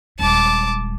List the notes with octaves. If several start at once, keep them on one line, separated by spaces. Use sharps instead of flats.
D#1 G#3 A5 D6